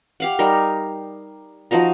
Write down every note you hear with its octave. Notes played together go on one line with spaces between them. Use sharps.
G4 F5 F#5
G3 D#4 A#4
F3 D#4 F#4 A#5